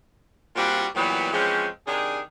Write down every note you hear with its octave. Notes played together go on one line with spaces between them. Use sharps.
A#2 G3 C4 D4 F4 F#4
A#2 E3 F#3 G3 B3
E3 F3 G#3 C4 C#4
C3 D#3 D4 D#4 G#4